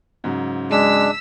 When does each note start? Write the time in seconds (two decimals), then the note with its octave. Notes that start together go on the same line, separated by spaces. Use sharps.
0.24 G#2 C#3 F#3
0.71 G#3 D4 E6 B6